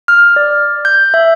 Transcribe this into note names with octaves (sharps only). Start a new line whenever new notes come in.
F6
D5
G6
E5